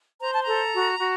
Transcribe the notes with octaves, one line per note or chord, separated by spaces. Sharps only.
C5 A#5
A5
A4 A#5
F#4
F#4